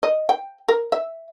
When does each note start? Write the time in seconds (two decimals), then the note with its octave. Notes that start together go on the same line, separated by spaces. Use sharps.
0.03 D#5
0.29 G5
0.68 A#4
0.92 E5